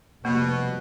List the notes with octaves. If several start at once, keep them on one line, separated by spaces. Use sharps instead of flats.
F1 B2 G3 A#3